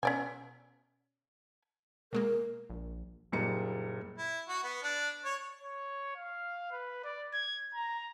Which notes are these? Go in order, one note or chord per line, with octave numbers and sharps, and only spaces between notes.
B2 C#4 D5 G#5
B2 G#3 A#3 A#4
A#1
F#1 A#2 G3 D#4 C#7
E4
F#4
B3
D4
C#5
C#5
F5
B4
D5
G#6
A#5